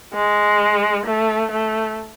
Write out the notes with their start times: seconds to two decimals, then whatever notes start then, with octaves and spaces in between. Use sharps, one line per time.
0.14 G#3
1.05 A3
1.51 A3